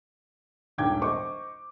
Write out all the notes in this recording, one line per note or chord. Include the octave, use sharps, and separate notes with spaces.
D#1 A#1 G#2 G5 D6 G#6
C5 D#5 C#6 D6